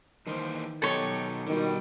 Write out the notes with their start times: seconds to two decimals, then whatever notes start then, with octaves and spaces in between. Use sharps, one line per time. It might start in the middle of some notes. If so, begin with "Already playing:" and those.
0.27 D#3 E3 A#3 C5
0.82 B2 F#3 D#4 G4 A4 C#5
1.46 B2 D3 D#3 G3 D4 D6